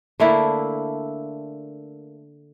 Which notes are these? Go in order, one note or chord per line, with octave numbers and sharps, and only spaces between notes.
D3 A3 A#3 E4